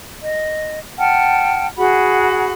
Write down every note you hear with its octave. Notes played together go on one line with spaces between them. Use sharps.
D#5
F#5 G5 A5 F6
F#4 G#4 F#5 B5